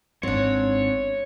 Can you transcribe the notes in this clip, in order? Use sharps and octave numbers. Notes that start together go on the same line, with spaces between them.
G#1 G#2 C4 D4 C#5